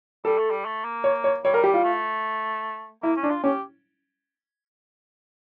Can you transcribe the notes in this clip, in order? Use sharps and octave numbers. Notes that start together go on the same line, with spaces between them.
G3 A4
A3
G3
A3
A#3
C#5
C#5
G3 C#5
A#4
G4
F4
A3
A#3 E4
C#4
D4
F4
C#4 G4